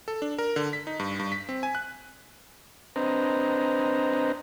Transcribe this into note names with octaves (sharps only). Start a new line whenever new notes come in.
A4
D4
A#4
D3
B6
D#4
G2
G2
B6
C4
G#5
F#6
C4 D4 B4 C5 D#5 A#5